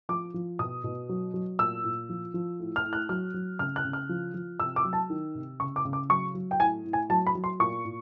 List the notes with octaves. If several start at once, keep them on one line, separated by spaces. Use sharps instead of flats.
F3 D6
F3
B2 D#6
B2
F#3
F#3
A#2 E6
A#2
F3
F3
A2
F6
A2
F#6
F#3 F6
F#3
C#3 F6
F#6
C#3
F6
F3
F3
C3 E6
D6
F#3
A5
D#3
C3
C#3 C#6
D6
C#3
D6
F#3 C#6
F#3
G5
A2 G#5
A2
G#5
F#3 A5
B5
F#3
C6
A#2 C#6
A#2